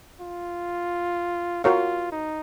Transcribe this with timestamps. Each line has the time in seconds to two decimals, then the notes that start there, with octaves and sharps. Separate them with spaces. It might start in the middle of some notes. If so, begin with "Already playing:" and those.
0.20 F4
1.64 F4 F#4 A#4 C#5 F5
2.12 D#4